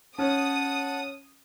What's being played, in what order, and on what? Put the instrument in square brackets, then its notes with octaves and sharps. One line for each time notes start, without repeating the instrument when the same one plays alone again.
[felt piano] C#4 [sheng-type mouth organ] F#5 A5 [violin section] D#6